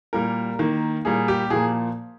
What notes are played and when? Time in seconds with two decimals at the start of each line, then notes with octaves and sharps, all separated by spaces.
0.13 A#2 G3 A#3 A#4
0.59 D#3 A#3
1.05 A#2 G3 A#3 G#4
1.28 G4
1.50 A#2 F3 A#3 G#4